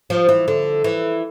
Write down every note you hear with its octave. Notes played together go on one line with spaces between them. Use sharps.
F3
E3
D3
E3